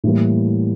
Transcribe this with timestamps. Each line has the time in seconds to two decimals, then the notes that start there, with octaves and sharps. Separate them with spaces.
0.04 A2 E3 G3 A#3